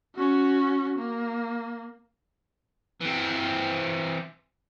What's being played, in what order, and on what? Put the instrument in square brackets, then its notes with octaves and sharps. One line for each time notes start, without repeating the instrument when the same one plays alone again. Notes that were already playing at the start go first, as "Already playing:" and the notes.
[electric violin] C#4 F#4
A#3
[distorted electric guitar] E3 C4